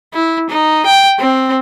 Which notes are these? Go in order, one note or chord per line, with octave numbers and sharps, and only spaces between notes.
E4
D#4
G5
C4